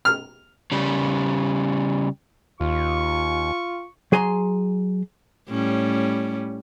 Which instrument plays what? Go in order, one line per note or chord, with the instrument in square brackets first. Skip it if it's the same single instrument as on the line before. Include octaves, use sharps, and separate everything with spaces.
[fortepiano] F6
[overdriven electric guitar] C#3 G3
[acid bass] D#2 [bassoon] F4 [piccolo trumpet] C#6
[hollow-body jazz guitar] F#3 G#4 G#5 A#5 C6
[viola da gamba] A2 G3 C#4